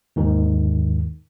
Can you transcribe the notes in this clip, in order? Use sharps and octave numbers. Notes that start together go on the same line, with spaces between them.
D#2 G#2 D#3